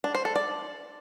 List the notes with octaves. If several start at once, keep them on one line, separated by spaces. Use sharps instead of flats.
D4
C5
A4
D5